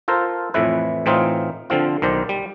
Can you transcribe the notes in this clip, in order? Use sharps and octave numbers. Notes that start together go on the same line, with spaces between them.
F4 A4 A#4 C5
F2 A2 E3 E4 B4
A2 E3 C4 D#4 F4
D3 F3 C4 F4
B1 D#3 C5 D5
G3